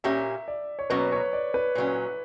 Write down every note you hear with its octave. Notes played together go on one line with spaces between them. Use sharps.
A#2 A#3 C#4 G4 E5
D5
C#5
B2 F#3 A#3 C#4 B4
C#5
D5
B4
A#2 F#3 C#4